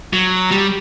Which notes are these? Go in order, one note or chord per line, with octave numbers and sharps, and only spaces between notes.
F#3
G3